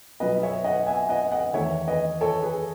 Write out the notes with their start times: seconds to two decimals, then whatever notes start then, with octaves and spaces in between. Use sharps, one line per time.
0.20 B2 F#3 B3 B4 D#5
0.42 C#5 E5
0.64 D#5 F#5
0.87 E5 G#5
1.09 D#5 F#5
1.32 D#5 F#5
1.53 E2 D#3 A3 C#5 E5
1.87 B4 D#5
2.21 A4 C#5
2.42 G#4 B4